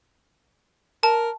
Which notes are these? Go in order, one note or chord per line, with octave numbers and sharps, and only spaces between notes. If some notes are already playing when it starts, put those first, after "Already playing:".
A#4 A5